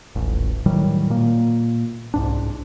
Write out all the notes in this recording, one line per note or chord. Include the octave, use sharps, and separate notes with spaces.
D#1 A1
A2 D#3 F#3 G3
A#2 A#3
C2 G#2 D4